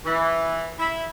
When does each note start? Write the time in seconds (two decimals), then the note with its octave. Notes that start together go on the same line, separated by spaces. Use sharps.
0.05 E3
0.79 E4